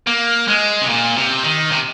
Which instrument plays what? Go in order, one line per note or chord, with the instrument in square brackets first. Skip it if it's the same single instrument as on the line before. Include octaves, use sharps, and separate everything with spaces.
[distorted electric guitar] A#3
G#3
C3
A#2
C3
D#3
C3